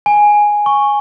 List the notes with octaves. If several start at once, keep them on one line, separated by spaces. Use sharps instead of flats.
G#5
C#6